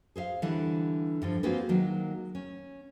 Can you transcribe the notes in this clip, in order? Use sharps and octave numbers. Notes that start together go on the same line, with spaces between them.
G#4 C5 E5 F5
D3 E3 G3 E4 F#5
G2 D3 F3
A#3 C4 F4 F#4 G#4 B4
D#3 F#3 G#3 A#3
C#4